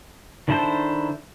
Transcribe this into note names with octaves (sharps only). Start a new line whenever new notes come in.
D#3 D4 E4 A4 C5